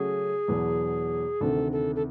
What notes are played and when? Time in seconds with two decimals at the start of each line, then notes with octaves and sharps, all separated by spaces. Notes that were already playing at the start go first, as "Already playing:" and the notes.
Already playing: C#3 F#3 A3 C#4 F#4 G#4
0.48 E2 B2 F#3
1.41 D2 C3 D#3 A4
1.72 A4
1.96 A4